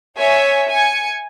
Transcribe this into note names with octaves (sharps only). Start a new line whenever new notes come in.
C#5 E5 G#5
G#5 C#7